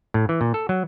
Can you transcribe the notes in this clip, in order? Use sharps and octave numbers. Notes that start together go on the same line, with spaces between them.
A2
E3
A#2
A4
F#3